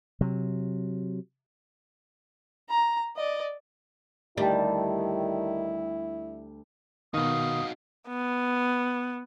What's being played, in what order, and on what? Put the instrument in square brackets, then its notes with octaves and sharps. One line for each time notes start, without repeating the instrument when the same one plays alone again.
[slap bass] C3 F#3
[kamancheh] A#5
D5 D#5
[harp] D2 G4 A5 [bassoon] D#3 [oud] G3 [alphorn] E4
[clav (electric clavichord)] B2 D#3 [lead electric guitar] D#4 F#4 [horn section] F5 [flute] D#6
[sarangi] B3